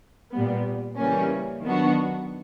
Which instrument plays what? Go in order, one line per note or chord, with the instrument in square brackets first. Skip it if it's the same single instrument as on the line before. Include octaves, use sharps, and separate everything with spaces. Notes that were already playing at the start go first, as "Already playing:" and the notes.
[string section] A#2 G3 B3
C#3 E3 G3 A#3 C#4
D#3 F#3 B3 D4 F#4